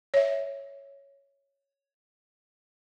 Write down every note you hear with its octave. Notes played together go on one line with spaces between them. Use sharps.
C#5 E5